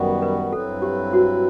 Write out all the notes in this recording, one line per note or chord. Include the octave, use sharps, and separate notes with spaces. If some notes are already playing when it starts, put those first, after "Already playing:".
Already playing: F#2 D#3 G3 B3 F#4
B4
G2 F#3 C4 E4 A4 B4
G4
F#4